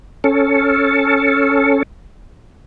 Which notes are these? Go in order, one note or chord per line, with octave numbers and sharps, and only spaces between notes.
C#4 A4